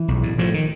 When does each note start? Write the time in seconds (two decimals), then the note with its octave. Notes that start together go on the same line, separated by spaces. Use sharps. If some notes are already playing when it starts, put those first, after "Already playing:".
Already playing: E3
0.08 B1
0.23 A2
0.38 A2 F3
0.54 D#3